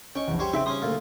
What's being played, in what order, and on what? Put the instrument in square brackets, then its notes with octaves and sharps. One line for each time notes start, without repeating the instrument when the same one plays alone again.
[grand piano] C#4 D#5 [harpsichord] G5 C#6
[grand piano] A#1 E2
[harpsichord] G3 C5 C#5 [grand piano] G4 C#6
[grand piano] C#3 [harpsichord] C4 [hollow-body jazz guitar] D#4 E5 G5
[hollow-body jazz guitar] G2 C5 C6 [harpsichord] C#4 G#5 D#6
[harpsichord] D2 A#2 F4